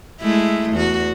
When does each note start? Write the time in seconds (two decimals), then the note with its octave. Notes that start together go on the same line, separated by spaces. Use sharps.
0.21 G#3 A3 E4
0.73 E2 F#4